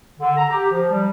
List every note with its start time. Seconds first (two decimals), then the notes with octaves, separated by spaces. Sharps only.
0.20 D3
0.37 A#5
0.50 G4
0.71 F3
0.91 G3